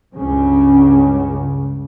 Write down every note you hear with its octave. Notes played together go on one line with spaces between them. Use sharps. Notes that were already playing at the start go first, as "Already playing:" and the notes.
C#2 G2 C#3